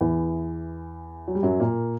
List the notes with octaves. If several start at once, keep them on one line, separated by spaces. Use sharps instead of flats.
E2 E3
F#3
G3
F#2 F#3
A#2 A#3